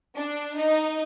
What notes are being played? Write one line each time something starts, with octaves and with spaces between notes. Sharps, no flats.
D4
D#4